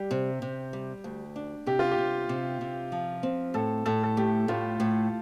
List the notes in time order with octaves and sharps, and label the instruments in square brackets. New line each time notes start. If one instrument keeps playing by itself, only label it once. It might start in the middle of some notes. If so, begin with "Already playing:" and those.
Already playing: [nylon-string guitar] G3 [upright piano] G4
[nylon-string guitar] C3
C3
G3
D2
D4
[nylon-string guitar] C3 [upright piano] G4
[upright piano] F4
G4
[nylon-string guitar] C3
C3
C3
F3
C4
[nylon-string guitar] A2 [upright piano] A4
[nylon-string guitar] A2 [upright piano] A4
[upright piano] A4
[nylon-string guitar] A3 [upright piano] G4
[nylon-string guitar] A2 [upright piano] F4
[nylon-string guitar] A2